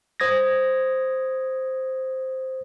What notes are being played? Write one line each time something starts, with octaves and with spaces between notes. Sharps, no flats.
C5 D#6 G#6 A#6